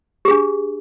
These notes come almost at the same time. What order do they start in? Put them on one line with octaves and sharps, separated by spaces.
G4 G#4 D4